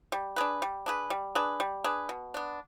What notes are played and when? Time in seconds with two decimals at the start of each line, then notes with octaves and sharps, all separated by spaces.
0.12 G3
0.36 D4 G#4 B4
0.62 G3
0.86 D4 G#4 B4
1.10 G3
1.35 D4 G#4 B4
1.60 G3
1.84 D4 G#4 B4
2.09 B2
2.34 B3 D4